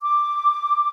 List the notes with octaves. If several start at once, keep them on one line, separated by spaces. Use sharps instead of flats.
D6